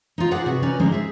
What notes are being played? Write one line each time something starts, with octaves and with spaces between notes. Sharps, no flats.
D#4 F4
G#4 C5 D5 F#5
C3 F#4 B4
C#4 D#4 B4 D5 G#5
D3 F3 G3 G#3 D#4 C5
G#4 E5